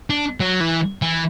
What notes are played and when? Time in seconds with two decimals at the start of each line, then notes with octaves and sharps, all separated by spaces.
0.10 D4
0.40 F#3
0.60 E3
1.02 E3